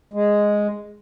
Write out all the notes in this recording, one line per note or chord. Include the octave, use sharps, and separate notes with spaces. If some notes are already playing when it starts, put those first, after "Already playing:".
G#3